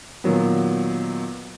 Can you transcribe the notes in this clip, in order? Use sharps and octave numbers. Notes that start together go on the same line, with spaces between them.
A#2 D#3 F#3 B3